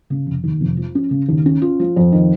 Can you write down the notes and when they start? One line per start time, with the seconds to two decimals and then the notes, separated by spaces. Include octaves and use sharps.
0.10 C#3
0.26 F1
0.44 D#2
0.61 F1
0.77 F3
0.95 C#4
1.11 C#3
1.29 D#2
1.46 C#4
1.62 F4
1.80 F3
1.96 F2
2.12 D#3